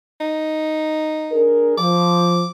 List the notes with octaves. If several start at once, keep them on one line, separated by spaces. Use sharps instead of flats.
D#4
D4 G#4 A#4
F3 D6